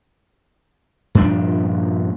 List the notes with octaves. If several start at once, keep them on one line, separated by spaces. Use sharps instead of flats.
G2 A#2 F3 D4